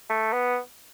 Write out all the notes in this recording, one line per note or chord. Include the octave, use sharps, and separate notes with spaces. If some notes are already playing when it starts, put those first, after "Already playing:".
A3
B3